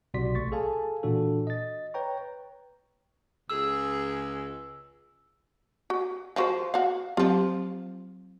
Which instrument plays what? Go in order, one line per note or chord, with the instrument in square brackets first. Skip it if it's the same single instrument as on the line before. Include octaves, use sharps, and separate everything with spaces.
[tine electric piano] B1 C3 F#4 D5 C6 B6
A1 A3 C#6 A6
G#4 A4 F5 G#5 A5
A#2 E3 D4 F#4 A4
D#5 A6
B4 C#5 G5 A#5 C#6
[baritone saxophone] C#2 [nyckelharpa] G#4 [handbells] E6
[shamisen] F#4
F3 F#4 C5
F#4 F5
[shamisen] F3 F4 [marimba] F#3 C4 G4